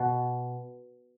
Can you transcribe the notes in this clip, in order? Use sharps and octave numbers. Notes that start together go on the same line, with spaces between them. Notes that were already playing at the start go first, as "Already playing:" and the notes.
Already playing: B2